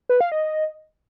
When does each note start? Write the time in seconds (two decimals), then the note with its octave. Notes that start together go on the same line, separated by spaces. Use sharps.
0.09 B4
0.21 F5
0.32 D#5